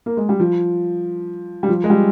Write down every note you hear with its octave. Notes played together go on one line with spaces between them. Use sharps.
A#3
G#3
G3
F3
G3
F3
G#3
G3